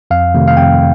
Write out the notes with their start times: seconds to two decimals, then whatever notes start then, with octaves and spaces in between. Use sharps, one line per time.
0.11 F2 F5
0.35 C3 D#3 A3
0.48 F5
0.57 F2 G5